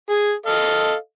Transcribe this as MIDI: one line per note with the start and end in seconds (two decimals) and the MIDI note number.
0.09 0.33 68
0.46 0.94 69
0.46 0.94 75
0.46 0.94 77